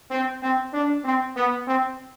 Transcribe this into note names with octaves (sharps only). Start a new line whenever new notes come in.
C4
C4
D4
C4
B3
C4